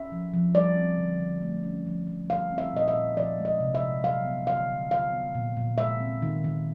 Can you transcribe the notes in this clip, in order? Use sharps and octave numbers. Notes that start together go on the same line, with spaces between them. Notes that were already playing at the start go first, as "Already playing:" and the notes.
Already playing: C#4 E5
F3
F3
G3 D5
C4
D3
D3
A3
C#4
F3
F3
G3 F5
C4
E5
A#2 D#5
E5
A#2
F3 D5
G#3
D#5
C3
E5
C3
F#3 F5
B3
D3 F5
D3
F#3 F5
B3
A#2
A#2
G#3 E5
C4
D#3
D#3